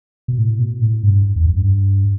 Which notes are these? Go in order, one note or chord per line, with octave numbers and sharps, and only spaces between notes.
B2
A2
B2
A2
G2
E2
F#2
G2